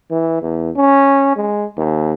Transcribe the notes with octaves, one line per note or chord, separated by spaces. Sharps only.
E3
E2
C#4
G#3
D#2